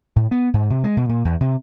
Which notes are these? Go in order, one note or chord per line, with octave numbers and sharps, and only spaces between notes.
A2
B3
G#2
C3
G#3
B2
A#2
E2
C3